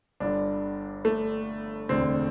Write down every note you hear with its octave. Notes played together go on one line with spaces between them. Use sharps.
G1 G2 D3 D4
A3
E1 D2 D3 C4